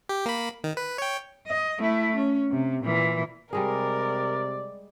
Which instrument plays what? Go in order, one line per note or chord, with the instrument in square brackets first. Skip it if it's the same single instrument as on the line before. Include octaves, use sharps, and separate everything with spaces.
[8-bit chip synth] G4
A#3 B5
D#3
B4
C#5 G5
[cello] D#5
A3 E4
C#4
C3
A#2 E3
[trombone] C3 [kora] G3 G#3 G#4 [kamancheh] A#4 [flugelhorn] D5